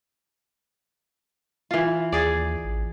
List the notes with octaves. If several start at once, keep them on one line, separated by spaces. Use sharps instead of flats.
E3 F4
D#2 G#4 D5
A1